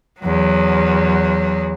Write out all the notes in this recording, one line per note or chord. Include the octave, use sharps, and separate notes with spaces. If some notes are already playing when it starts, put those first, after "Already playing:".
E2 F#3